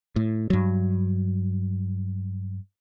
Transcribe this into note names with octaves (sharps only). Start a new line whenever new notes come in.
A2
G2 F#3